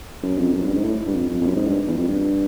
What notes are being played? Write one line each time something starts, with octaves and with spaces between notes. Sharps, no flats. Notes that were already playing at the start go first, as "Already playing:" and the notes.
F#2
F2
F#2
G2
G#2
A2
G2
F2
F2
F2
F#2
G#2
G2
E2
F2
G2